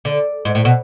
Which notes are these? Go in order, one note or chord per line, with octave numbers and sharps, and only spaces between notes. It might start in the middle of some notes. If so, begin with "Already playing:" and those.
D3
G#2
A2
B2